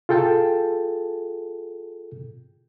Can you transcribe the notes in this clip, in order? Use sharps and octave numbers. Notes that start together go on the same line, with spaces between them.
F4 G#4 A4 G5 A5